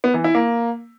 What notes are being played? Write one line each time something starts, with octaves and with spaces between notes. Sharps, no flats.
B3
E3
E4
A#3